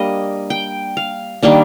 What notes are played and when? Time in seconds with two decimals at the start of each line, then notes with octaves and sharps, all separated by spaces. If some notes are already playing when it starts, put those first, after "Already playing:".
Already playing: G3 A#3 D4 D#5
0.50 G5
0.97 F5
1.43 D#3 G3 A#3 D4